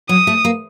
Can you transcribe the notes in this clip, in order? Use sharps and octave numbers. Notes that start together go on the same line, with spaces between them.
F#3 D#6
A3
A#3